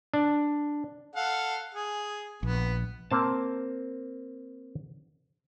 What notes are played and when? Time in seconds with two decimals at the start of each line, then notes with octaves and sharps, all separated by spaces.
0.14 D4
1.16 A4 F5 F#5
1.75 G#4
2.43 A#1 B3
3.11 A#3 C4 A5